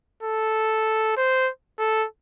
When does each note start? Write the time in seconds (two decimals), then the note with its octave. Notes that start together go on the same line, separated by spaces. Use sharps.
0.23 A4
1.17 C5
1.79 A4